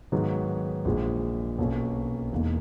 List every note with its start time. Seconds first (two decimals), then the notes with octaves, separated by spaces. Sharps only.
0.12 G#2 D#3 F#3 B3
0.85 A#1 A#2 G#3
1.58 B1 B2 A#3 C#4
2.32 E1 E2 B2 A#3 D#4